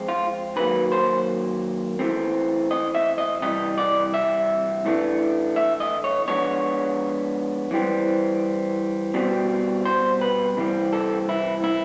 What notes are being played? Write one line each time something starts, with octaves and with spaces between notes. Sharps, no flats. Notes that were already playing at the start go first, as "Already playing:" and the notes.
Already playing: F3 G#3 C4
F4
D#3 F#3 A#3 B4
C5
E3 A3 C4
D#5
E5
D#5
C3 E3 G3 D#5
D5
E5
A2 E3 A3 D4
E5
D#5
C#5
F3 G#3 B3 D4 C#5
E3 G3 C4
B2 G3 C4
C5
B4
C3 E3 G3 C4
A4
E4
E4